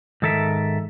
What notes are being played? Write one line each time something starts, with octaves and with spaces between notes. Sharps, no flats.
G#2 D#3 A4 A#4 E5